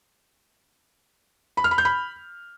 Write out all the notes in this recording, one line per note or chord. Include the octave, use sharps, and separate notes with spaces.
B5
F6
B5
G6
B5